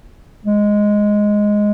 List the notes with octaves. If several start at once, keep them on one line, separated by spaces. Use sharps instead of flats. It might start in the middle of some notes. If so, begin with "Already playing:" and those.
G#3